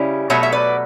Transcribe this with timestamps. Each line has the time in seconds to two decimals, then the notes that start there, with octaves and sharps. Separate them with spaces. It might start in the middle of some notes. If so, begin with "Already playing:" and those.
Already playing: C#3 G3 C#4 E4
0.30 B2 F#3 A3 C#5 E5
0.43 E5
0.52 B4 D5